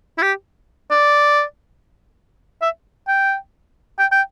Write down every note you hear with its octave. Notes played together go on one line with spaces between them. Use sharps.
E4
G4
D5
E5
G5
G5
G5